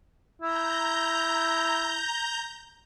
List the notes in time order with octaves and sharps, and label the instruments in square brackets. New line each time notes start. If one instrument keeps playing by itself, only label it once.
[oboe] E4 [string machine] A#5 G6